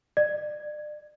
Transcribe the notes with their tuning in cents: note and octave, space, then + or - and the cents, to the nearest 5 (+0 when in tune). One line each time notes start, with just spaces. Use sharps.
D5 +35